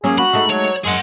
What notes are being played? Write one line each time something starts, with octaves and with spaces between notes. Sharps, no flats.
F#3 A#3 C#4 G#4
F#4 B5
G#3 A3 D#4
F#3 C#5
F#2 G#3 G#4 F#5